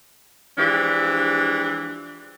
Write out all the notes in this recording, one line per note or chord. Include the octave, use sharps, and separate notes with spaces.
E3 F3 G#3 D4 G4